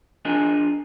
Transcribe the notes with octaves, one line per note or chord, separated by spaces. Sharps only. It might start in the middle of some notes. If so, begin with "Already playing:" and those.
D4 F4 G#4 A#4 D#5